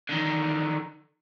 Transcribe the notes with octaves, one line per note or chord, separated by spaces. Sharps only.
D3 D#3